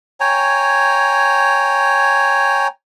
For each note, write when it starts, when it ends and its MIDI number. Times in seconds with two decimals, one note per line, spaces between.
0.20 2.68 73
0.20 2.68 79
0.20 2.68 80
0.20 2.68 82